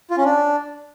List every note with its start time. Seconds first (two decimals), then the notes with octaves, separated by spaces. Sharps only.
0.10 F4
0.17 C#4
0.24 D4